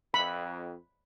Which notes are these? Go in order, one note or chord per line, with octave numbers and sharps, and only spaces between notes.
F2 B5